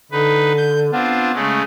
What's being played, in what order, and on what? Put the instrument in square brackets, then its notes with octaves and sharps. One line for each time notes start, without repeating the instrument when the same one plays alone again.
[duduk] D3 [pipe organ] D#4 B4
[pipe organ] G6
[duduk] B3 [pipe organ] C4 D4 F4
[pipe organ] C#3 G#3 A3